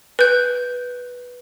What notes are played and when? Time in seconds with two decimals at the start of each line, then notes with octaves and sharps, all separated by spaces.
0.19 B4 G6